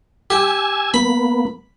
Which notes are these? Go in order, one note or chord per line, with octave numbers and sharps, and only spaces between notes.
G4 G#5 E6 G#6
A#3 B3 B5